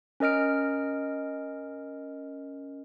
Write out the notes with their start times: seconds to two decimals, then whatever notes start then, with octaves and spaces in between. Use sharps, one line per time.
0.20 C#4 A#4 D#5 F6 D7